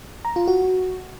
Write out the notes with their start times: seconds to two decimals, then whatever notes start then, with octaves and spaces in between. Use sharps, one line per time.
0.25 A#5
0.36 F4
0.48 F#4